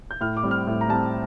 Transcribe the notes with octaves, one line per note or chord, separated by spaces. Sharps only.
G6
A2 F6
D6
G3 C4
F6
A2
A#5
G3 C4 A5